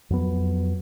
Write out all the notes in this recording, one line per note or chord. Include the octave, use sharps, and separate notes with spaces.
F2 F#3 B3